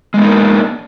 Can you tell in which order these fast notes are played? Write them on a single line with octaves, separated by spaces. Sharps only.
G#3 B3 D#4 A#3 D4